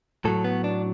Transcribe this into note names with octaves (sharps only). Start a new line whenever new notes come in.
A2 F#3 A4
B3
D4